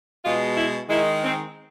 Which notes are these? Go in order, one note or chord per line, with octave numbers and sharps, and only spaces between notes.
B2 G#3 F4
E4
D#3 G#3 E4
C4